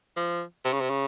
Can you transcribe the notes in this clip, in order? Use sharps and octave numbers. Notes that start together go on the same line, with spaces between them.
F3
C3
C#3
C3
C#3